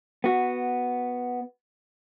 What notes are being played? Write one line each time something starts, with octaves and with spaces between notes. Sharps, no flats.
B3 F#4